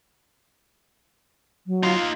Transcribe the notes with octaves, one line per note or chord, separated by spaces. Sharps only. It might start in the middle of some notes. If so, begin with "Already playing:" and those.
F#3
D#4 F4 F5 C6